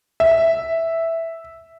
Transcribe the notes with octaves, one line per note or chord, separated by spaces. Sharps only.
E5